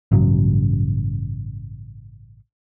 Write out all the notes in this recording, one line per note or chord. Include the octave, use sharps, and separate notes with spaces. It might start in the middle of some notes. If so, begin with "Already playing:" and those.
A1 G2 C#3 F#3